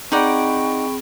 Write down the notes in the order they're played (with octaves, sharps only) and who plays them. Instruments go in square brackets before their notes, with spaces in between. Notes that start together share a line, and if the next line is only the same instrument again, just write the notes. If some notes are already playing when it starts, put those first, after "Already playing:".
[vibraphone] C4 G#4 [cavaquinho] D#4 D5 F#5 [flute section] G5 B5 C#6